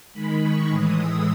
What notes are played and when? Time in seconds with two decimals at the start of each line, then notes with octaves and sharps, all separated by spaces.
0.13 D#3 G#3 B5
0.41 C#6
0.70 A2 E3 G#3 D#6
0.98 E6